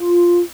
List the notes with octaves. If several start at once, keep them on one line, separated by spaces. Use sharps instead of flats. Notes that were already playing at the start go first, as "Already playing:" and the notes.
Already playing: F4